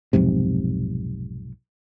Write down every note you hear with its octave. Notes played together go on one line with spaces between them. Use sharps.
B1 F2 G#2 C3